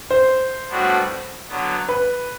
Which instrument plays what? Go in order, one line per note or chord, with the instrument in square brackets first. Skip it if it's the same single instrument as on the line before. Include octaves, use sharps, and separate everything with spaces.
[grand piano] C5
[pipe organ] A2 G3 B3 D4 F#4
D3 F#3 B3
[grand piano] B4